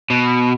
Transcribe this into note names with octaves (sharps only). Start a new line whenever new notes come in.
B2